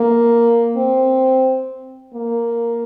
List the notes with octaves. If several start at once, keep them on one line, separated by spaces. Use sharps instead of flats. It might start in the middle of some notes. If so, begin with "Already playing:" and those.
Already playing: A#3
C4
A#3